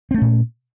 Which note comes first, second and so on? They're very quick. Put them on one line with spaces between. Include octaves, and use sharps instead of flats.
C4 A3 C#4 A#2